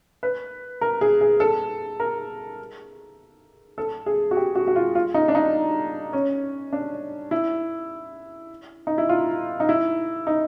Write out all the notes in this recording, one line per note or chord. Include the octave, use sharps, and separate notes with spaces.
B4
A#4
G#4
G#4
A4
A#4
A4
G#4
F#4
G4
F#4
F#4
F4
F4
D#4
D4
D#4
C#4
D4
E4
D#4
E4
F4
D#4
E4
D#4